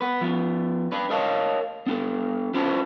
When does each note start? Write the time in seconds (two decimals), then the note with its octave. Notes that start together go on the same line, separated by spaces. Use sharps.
0.01 B3 B4
0.21 F3 B3
0.92 D4 B4
1.10 A#4 C#5 D#5 F5 A5
1.86 B3 D4 A4
2.54 C#4 D4 F4 B4 C5 A5